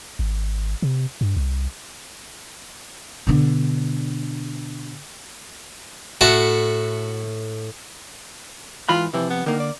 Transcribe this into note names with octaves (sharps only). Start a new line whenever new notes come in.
G#1
C3
G2
C2
B2 D3
A2 F#4 E5 A5
G#2 E3 F4 B5
C3 E3 F3
B3
D3 D#3 A#3
D5